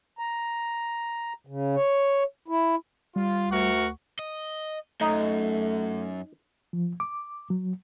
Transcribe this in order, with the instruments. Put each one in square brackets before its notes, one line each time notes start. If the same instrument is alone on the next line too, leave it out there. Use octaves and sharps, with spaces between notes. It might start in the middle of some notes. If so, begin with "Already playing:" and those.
[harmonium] A#5
C#3
C#5
E4
[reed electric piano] G3 [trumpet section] F4
[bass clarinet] D2 [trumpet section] A#4 F#5 C#6
[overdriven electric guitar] D#5
[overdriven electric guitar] F#2 [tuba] A3 [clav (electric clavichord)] D#4
[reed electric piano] F3
D6
F#3